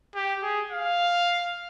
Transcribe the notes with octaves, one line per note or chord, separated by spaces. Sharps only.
G4
G#4
F5